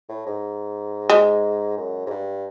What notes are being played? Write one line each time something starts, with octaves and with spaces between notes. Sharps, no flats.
A2
G#2
G#3
F#2
G#2
G2